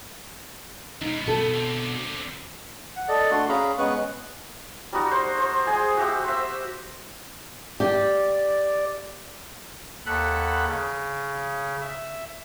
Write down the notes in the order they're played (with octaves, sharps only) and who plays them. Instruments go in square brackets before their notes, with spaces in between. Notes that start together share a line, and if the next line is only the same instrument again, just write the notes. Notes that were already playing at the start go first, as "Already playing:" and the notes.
[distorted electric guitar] C#2 B2 [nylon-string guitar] D#4
[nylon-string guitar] B2 A4 [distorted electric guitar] A3 B3
[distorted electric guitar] D3 C4
[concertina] F#5
A4 D5 D#5
A3 D4 F#4 F#5 C6
C#4 G#4 F5 A#5 B5
G#3 B3 C#4 B4 C#6 F#6
[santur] G3 D#4 F#4
C5
C5
G#3 G#4
F#4 G4 E5
C5 E5
[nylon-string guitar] G4 [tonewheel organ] D5
[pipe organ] D#2 A4 F#5 B5 F#6
C#3
E5